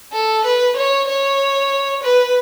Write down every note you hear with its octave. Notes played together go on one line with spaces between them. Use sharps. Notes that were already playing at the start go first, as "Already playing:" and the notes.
A4
B4
C#5
C#5
B4